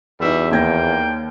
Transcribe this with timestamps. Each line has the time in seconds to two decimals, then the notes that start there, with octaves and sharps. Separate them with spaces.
0.20 E2 G3 D#4 F#4 B4 E5
0.51 D#2 A#3 G5 G#6 A#6